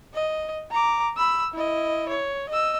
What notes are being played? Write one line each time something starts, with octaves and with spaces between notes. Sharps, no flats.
D#5
A#5 D6
B5 E6
E4 D#5
C#5
D#5 E6